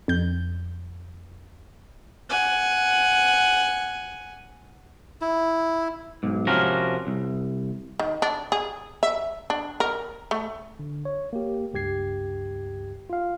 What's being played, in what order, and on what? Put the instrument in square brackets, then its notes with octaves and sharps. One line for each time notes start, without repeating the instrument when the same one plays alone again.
[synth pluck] F2 G6
[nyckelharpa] F#5 G#5
[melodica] E4
[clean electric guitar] B1 G#2
C3 F3 C#4 F#4 A#4
C2
[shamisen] D#3
D4
G#4
E5
D4
A#4
A3
[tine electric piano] D3
C#5
A#3 G4
C#2 G2 G4 G#6 C7
F4 F5